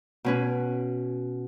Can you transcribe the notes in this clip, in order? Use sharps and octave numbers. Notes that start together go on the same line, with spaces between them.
B2 C#4 B4